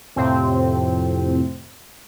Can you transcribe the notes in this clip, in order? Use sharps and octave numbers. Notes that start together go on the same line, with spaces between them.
F2 A2 C3 C4